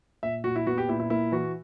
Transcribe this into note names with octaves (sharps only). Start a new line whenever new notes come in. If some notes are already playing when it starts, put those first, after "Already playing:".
A#2 E5
A#2 F#4
E4
B3 F#4
G4
A#2 E4
E4
A#3 E4
E3 F#4